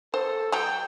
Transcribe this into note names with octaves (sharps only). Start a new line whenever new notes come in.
A4 C5
F#3 A4 G5 A#5